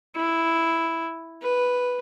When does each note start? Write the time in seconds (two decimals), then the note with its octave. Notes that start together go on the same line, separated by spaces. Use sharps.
0.16 E4
1.42 B4